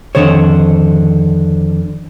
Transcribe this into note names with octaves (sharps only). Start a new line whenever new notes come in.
F2 G#2 D3 D#3 C5 C#5